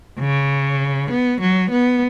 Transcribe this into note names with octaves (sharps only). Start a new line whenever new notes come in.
C#3
B3
F#3
B3